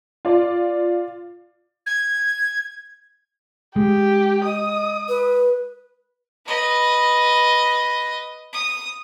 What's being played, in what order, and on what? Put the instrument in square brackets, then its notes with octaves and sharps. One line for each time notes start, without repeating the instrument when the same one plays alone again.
[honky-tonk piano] F4 D5
[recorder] G#6
[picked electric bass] G#3 [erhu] G4
[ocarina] D#5 [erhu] D#6
[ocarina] B4
[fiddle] B4 D#5
D#6